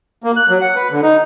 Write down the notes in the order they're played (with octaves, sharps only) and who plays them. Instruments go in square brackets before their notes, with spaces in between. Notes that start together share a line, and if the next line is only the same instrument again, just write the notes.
[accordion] A#3
F#6
F#3
F#5
B4
D3
D#4